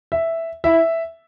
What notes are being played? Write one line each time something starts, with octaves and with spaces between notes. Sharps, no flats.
E5
E4 E5